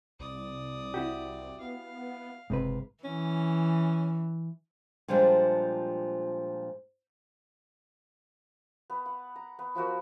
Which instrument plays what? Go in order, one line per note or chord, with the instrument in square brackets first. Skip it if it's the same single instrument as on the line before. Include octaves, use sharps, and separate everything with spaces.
[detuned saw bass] C2 [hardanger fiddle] D5 D#6
[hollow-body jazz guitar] E4 F#4 G4
[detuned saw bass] B3 [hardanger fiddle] F5
[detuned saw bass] F#1 [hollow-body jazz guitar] G#2 C3 B4
[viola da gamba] E3 [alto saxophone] C#4
[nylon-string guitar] A#2 F3 G3 G#3 D4
[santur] B3 B4
F#5
A#5
B3
F3 B3 F#4 A#4